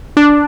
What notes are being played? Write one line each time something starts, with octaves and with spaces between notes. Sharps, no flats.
D4